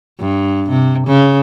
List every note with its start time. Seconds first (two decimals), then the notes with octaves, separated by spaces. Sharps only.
0.19 G2
0.70 C3
1.07 C#3